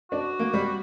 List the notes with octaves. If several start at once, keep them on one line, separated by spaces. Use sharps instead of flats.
D4 F#4
A#3
G3